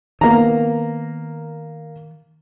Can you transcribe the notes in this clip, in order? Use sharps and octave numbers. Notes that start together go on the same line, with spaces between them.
D#3 A#3 B3 A#5